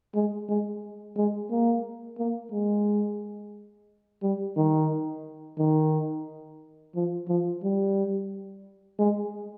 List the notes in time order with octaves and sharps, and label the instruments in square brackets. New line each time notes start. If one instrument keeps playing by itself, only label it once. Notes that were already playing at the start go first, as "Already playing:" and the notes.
[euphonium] G#3
G#3
G#3
A#3
A#3
G#3
G3
D#3
D#3
F3
F3
G3
G#3